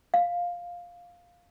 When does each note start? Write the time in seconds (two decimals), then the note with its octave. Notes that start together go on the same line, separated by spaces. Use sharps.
0.14 F5